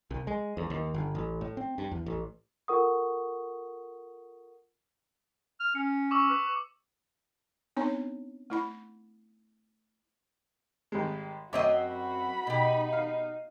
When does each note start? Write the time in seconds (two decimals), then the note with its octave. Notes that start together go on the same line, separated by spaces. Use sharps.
0.11 C2
0.27 G#3
0.57 E2
0.70 D#2
0.94 G1
1.15 A1
1.41 A2
1.57 C4
1.78 G2
1.91 E2
2.06 A1
2.68 F4 A4 A#4 F#5 C#6 D#6
5.60 F6
5.75 C#4 C#7
6.11 C#6 D6 E6
6.30 B4
7.77 B3 C4 D4 D#4 C#5
8.50 A3 E4 B5
10.92 G#1 G3 G#3
11.53 F#2 C4 F#4 C#5 D#5 E5 D6
11.96 B5
12.47 B2 D#4 G4
12.93 F5